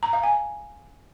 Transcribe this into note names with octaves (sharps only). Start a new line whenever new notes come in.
A#5
F5
G#5